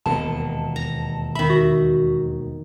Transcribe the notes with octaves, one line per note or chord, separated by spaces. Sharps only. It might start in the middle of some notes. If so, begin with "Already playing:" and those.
E1 D#2 A#2 A5
A#5
D#3 E5 B5
F#4